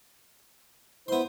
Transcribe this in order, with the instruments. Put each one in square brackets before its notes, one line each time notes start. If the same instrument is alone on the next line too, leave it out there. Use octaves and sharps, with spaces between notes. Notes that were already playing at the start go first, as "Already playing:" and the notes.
[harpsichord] B3 C6 [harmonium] E4 C5